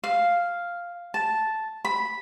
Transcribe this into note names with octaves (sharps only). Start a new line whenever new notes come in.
F5
A5
B5